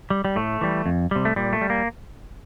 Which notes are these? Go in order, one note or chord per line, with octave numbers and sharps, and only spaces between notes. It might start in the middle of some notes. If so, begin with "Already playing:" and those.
G3
G3
A2 A3
E3 G3
F2
C3 G3
A3
A#2 G3
A3
G3
A#3